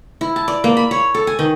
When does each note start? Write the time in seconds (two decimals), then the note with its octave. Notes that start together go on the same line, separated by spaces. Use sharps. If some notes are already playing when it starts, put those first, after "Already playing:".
0.21 E4
0.36 A5
0.48 D5
0.64 A#3
0.77 B5
0.91 C#5
1.14 A4
1.27 G#5
1.39 D#3